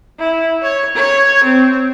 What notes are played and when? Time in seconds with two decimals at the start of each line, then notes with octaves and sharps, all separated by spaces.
0.19 E4
0.62 C#5
0.95 C#5
1.44 C4